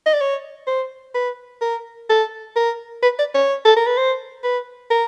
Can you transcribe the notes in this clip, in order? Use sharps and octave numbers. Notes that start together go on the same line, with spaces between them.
D#5
D5
C#5
C5
B4
A#4
A4
A#4
B4
D5
C#5
A4
A#4
B4
C5
B4
A#4